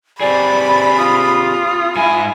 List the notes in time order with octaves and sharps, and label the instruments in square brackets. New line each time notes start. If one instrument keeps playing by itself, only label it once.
[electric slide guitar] C4 G4 G#4 [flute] D5 [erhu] B5
[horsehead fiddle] F4 [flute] D#6
[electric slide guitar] G#2 G#5 [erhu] E4